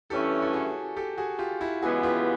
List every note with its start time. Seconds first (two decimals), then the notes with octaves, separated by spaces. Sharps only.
0.10 G2 E3 A3 C#4 E4 G4 A4
0.42 A4
0.53 F#4 G#4
0.96 G4 A4
1.18 F#4 G#4
1.39 F4 G4
1.60 E4 F#4
1.82 C#3 E3 G#3 B3 F#4 G#4
2.03 F4 G4